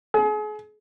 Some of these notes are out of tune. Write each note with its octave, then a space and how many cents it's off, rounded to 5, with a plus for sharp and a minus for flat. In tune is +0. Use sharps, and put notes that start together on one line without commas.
G#4 +35